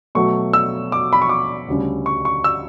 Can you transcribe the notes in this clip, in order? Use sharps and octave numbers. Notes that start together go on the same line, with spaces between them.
B2 F#3 A3 C#6
E6
D6
B5
C#6
D6
D2 C#3 G3 C#4
C#6
C#6
E6